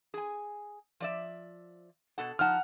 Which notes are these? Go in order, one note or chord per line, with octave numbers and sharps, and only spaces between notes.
G#4 G#5
F3 D5 E5
B2 A4 F#5
F3 D#4 F#5 A5 F6